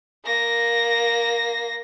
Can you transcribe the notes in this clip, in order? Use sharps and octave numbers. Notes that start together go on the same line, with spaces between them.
A#3 A#6